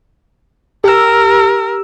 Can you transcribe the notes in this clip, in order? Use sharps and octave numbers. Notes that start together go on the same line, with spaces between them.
G4 A#4 E6